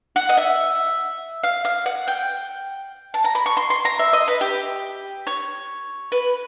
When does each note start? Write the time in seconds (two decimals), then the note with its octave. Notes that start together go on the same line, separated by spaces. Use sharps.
0.16 F#5
0.29 D#5
0.37 E5
1.43 F5
1.65 F5
1.86 F#5
2.08 G5
3.14 A5
3.24 A#5
3.35 B5
3.46 C#6
3.57 C6
3.70 C6
3.85 A#5
3.99 E5
4.13 D#5
4.28 B4
4.41 G4
5.27 C#5
6.12 B4